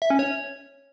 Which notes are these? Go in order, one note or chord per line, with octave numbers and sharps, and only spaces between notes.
E5
C#4
C#5